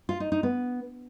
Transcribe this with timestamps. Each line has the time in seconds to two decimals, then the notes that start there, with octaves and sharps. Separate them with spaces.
0.09 F4
0.20 D#4
0.32 D#4
0.43 B3